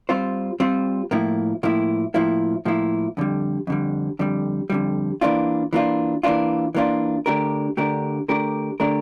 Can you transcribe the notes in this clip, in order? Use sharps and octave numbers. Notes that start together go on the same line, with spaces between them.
G3 C4 F4 C5
G3 C4 F4 C5
A2 F3 A#3 E4
A2 F3 A#3 E4
A2 F3 A#3 E4
A2 F3 A#3 E4
F2 D3 G3
F2 D3 G3
F2 D3 G3
F2 D3 G3
E3 A#3 D4 F4
E3 A#3 D4 F4
E3 A#3 D4 F4
E3 A#3 D4 F4
D3 A3 D4 G4 A#4
D3 A3 D4 G4 A#4
D3 A3 D4 G4 A#4
D3 A3 D4 G4 A#4